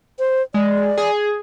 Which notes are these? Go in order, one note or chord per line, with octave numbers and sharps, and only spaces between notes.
C5
G#3 D5
G#4